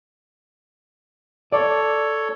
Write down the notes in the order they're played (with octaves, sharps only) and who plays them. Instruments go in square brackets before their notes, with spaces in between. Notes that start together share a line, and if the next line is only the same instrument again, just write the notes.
[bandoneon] A4 C#5 [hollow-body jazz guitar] D5